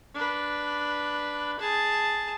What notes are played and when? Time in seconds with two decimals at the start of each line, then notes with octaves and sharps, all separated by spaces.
0.14 D4 B4
1.59 G#4 A5